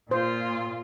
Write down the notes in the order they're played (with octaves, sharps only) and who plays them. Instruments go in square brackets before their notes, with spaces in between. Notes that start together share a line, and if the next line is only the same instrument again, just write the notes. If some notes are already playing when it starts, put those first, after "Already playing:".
[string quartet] A#2 F4 [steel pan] C5